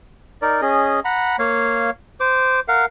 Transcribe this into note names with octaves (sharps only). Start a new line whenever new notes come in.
D#4 A#4 D5
C#4 G#4 D#5
F#5 A#5 B5
A#3 C#5 F5
C5 D6
A#4 F5 F#5